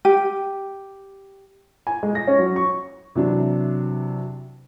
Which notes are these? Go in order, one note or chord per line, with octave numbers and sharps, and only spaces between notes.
G4
G#5
G#3
A#6
C#4
F#3
C#6
C3 E3 F#3 D4